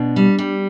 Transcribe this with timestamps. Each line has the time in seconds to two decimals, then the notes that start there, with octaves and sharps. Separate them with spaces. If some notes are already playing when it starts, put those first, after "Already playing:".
Already playing: B2 D4
0.16 G3
0.38 G3